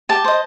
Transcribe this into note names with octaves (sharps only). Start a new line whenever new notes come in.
G4 A5
C5 D#5